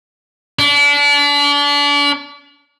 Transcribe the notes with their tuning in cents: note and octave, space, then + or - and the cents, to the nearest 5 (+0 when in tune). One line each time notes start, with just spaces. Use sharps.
D4 -35